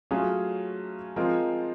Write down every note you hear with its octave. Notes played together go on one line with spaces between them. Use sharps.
F#3 A3 C#4 F4 G#4
F3 G#3 C4 F4 A#4